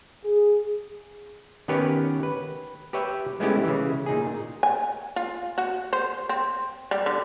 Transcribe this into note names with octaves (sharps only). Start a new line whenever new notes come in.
G#4
D#3 B3 C#4 G4 B4 C#5
B4
G4 B4 C#5 E5 G5
G#3 A3 B3 C#4 E4 G4
C#3 E3
A#2 D#4 G#4
G#5
F4
F#4
C5
C4
G3
D3